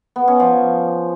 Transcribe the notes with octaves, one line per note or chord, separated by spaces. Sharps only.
B3
C#4
F3